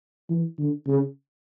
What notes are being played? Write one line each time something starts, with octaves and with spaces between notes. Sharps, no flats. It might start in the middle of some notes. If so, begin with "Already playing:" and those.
E3
D3
C#3